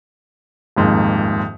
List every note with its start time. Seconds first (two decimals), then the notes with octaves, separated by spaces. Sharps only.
0.76 D#1 F2 G#2 A#3